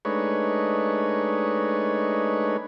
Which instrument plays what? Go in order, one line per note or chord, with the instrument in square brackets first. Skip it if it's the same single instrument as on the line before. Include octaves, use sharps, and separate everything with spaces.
[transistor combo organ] G#3 A3 D4 D#4 B4 C#5